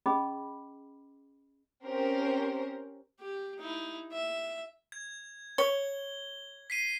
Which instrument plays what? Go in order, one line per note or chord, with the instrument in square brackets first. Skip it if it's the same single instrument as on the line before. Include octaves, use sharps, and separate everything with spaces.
[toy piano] C#4 G#4 D#5 B5 D6
[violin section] C4 C#4 G4 A#4 C5
[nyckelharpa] G4
D#4 E4
E5
[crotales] G#6
[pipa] C#5 [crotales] G7
[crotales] B6 C7 D#7